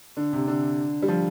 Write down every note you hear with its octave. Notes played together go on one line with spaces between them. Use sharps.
D3
C3
D3
G3
F3